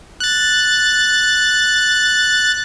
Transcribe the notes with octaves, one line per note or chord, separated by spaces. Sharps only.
F#6 A6